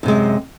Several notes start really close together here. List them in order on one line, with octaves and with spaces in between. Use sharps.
F#2 C3 G#3